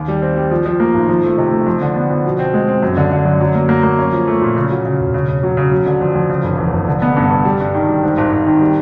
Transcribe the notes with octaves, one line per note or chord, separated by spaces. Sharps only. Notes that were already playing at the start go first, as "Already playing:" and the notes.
Already playing: D#2
G3
C4
G3
F3
F3
A#3
G#1
F3
A3
C3
A3
F2
D3
B3
F2
B2
C4
G#3
C4
F#2
D3
D3
F#2
F#3
A#3
A#3
A#3
C#4
F3
A3
A#2
C#3
F#3
C#3
E1
C#3
C#3
F#3
C#3
F#3
D3
F2
F2
C#3
F1
E2
F1
D3
B3
G2
G2
G3
G2
D#3
G3
G#2
G#1
G#1
D#3
G3